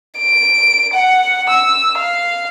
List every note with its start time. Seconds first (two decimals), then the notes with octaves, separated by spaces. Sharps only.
0.19 D7
0.94 F#5
1.50 E6
1.98 F5